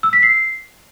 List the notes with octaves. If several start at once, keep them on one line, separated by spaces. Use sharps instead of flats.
E6
B6
C7